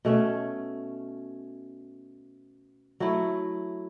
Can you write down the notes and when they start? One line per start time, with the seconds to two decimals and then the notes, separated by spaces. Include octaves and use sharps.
0.05 B2 A3 C#4
3.00 F#3 A3 E4